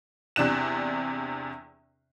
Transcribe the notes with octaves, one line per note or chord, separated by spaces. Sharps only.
E2 C3 D4 F#6 E7